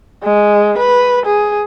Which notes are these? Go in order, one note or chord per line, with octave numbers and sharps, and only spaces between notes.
G#3
B4
G#4